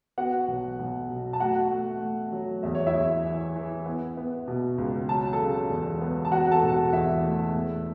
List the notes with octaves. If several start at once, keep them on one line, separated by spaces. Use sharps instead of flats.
B3 F#4 F#5
B1
B1
B2
A5
A3 F#4 F#5
A3
A3
F#3
E2 E5
C#5
E4 E5
E2
E3
E3
B3
B3
B2
C#2
F#3 A5
A4 A5
C#3
E2
B3
A5
E2 F#4 F#5
A4 A5
E1
F#4 F#5
E2 E4 E5
A3
E2